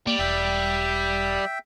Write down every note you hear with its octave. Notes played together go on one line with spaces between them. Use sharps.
G3 A#3
E1 E5 G5